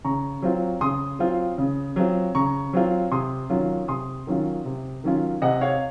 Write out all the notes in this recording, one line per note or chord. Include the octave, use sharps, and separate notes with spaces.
C#3 A#5 C#6
F#3 C4 F4
C#3 C6 D#6
F#3 C4 F4
C#3
F#3 C4 F4
C#3 A#5 C#6
F#3 C4 F4
C3 C6 D#6
D#3 F#3 C#4 F4
C3 C6 D#6
D#3 F#3 C#4 F4
C3
D#3 F#3 C#4 F4
C3 D#5 F#5
C#5 F5